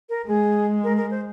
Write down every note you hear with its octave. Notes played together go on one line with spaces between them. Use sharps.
A#4
G#3 G#4
A#4
A#4
C5